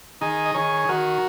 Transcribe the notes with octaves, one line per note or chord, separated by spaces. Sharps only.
D#3 D#4 G#4
D#5
D#3 G#4 C#5
D#3 F#4 A#4